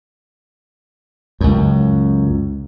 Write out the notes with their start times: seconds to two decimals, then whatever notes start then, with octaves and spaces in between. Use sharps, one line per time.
1.41 C#2 F#2